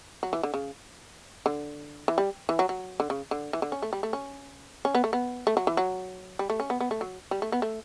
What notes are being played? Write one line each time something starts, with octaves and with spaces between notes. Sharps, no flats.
F#3
E3
D3
C#3
D3
E3
G3
E3
F#3
F#3
D3
C#3
D3
E3
D3
C#4
A3
G3
A3
C#4
C#4
B3
A3
B3
A3
F#3
E3
F#3
G3
A3
C#4
B3
B3
A3
F#3
G3
A3
B3
A3